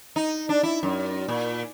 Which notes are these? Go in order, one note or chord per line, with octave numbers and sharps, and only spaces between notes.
D#4
D4
E4
F#2
A#2